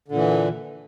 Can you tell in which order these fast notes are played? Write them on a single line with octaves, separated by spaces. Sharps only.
D3 A#2 E3